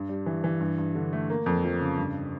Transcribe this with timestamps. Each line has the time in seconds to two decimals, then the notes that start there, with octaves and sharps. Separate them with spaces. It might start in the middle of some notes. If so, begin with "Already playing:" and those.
Already playing: G2
0.09 G3
0.26 E3
0.44 E3
0.61 G2
0.78 G2
0.95 D3
1.13 A3
1.30 A#3
1.46 F2
1.64 F3
1.80 C#3
1.98 G2